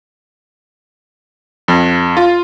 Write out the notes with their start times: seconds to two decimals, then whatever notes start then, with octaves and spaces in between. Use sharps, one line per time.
1.68 F2
2.17 F4